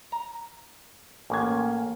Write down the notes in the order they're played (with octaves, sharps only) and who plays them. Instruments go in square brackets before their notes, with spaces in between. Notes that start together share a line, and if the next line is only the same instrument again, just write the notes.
[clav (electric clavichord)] A#5
[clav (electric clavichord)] A1 [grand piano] A#3 C#4 G#6